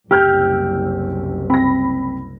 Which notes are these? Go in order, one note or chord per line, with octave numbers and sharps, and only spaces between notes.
F#1 C2 G4 E6 F6 G6
C4 B5 A#6